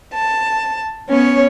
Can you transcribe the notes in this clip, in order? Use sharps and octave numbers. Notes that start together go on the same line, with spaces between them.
A5
B3 C#4 C#5